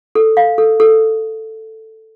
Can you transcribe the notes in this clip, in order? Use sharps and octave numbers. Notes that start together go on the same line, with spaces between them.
A4
F5
A4
A4